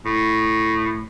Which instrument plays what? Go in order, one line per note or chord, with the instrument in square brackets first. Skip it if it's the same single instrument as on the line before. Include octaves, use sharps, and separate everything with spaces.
[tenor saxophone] A2